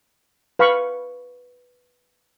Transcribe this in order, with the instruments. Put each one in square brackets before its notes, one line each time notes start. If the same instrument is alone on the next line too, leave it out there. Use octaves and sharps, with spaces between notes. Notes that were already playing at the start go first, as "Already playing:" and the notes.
[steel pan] B4 F5 B5 C#6